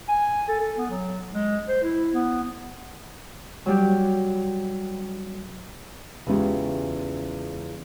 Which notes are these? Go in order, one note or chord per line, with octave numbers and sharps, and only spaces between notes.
G#5
A4
A4
B3
F#3
G#3
C5
E4
B3
F#3 G3 G4
E2 C#3 G#3 C#4 F4 G4